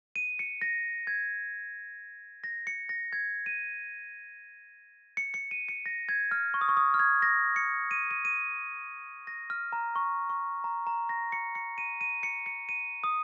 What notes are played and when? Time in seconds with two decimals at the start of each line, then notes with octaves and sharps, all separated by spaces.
0.16 D#7
0.39 C#7
0.61 A#6
1.07 G#6
2.44 A#6
2.67 C#7
2.89 A#6
3.13 G#6
3.46 D#7
5.17 C#7
5.34 C#7
5.51 D#7
5.69 C#7
5.86 A#6
6.09 G#6
6.31 F6
6.54 C#6
6.61 D#6
6.69 C#6
6.77 D#6
6.94 F6
6.99 G#6
7.22 A#6
7.56 C#7
7.91 D#7
8.11 D#7
8.25 D#7
9.27 A#6
9.50 F6
9.73 A#5
9.96 C#6
10.30 C#6
10.64 A#5
10.87 A#5
11.09 A#6
11.32 C#7
11.55 C#7
11.78 D#7
12.01 D#7
12.23 C#7
12.46 C#7
12.69 D#7
13.04 D#6